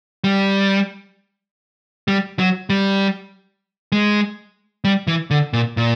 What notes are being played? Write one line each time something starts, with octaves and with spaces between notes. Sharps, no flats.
G3
G3
F#3
G3
G#3
G3
E3
D3
A#2
A#2